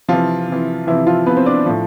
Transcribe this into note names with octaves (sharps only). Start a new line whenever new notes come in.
C3 E3 F3 F4
C3 E3
C3 E3 F3 E4
F3 F4
C3 F3 B3 B4
C4 C5
D4 D5
A2 F3